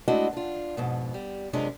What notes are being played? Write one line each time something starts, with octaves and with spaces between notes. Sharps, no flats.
G#3 A3 D4 E4 F#4 D#5
D4 F4
F2 G#2 B2
G3
F#2 C3 G#3 C#4 D4 F4